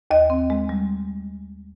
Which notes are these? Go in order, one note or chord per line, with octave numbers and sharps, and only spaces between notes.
D#2 D#5
C4
G#3
G3